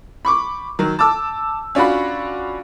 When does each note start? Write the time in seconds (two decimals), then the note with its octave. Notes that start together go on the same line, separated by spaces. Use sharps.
0.25 B5 C#6 D6
0.79 D#3 F#3
0.99 A5 D6 E6
1.75 C#4 D4 F4 F#4 B5